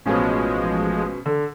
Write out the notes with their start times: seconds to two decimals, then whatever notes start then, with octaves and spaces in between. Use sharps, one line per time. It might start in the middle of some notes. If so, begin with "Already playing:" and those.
0.06 A1 B2 F3 G#3 C#4
1.26 D3